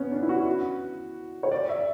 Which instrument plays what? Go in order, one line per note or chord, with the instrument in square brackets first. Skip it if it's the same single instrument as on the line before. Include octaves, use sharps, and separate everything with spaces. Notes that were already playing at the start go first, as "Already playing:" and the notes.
Already playing: [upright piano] B3 C#4
D4
E4
F#4
C#5
D5
E5